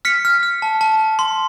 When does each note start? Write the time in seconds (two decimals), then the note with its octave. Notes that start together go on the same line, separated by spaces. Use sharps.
0.05 F6 B6 C#7
0.25 F6
0.43 F6
0.62 A5
0.81 A5
1.00 A5
1.19 C6